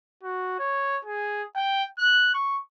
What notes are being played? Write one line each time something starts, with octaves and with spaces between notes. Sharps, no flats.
F#4
C#5
G#4
G5
F#6
C#6